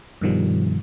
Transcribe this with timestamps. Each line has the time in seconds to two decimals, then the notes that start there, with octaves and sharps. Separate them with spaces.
0.21 G2 B2 D#3 F3 G3